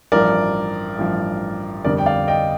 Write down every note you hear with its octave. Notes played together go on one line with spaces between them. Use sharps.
A1 G2 F3 A#4 D5
A1 G2 F3
G1 F2 D3 G3 A#4 D5
G5
D5 F5
D#5 G5